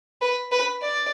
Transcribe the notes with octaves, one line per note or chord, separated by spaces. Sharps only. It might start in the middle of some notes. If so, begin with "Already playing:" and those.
B4
B4
D5